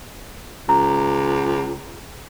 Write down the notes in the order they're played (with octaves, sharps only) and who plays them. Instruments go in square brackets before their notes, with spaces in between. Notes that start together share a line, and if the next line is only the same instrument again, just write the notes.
[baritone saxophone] C#2 [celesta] A#5